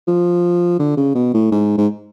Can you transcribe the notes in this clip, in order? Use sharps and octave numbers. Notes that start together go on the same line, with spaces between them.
F3
D3
C#3
B2
A2
G#2
G#2